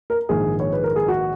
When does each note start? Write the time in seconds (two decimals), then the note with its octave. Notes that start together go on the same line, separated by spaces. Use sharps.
0.10 A#4
0.29 A#1 G#2 D#3 G#4
0.60 C#5
0.72 B4
0.84 A#4
0.96 G#4
1.08 F#4